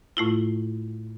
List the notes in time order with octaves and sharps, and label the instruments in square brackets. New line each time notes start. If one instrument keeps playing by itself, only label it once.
[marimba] A2 A3 E4 F4